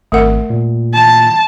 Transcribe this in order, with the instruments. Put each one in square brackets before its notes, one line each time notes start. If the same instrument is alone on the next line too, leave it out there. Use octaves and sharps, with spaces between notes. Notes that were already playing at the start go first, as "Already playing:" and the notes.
[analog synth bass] G#1 [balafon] A3 A#4 F#5
[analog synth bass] A#2
[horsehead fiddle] A5